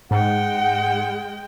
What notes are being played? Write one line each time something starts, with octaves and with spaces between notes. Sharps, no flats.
G#2 G#3 F#5 G5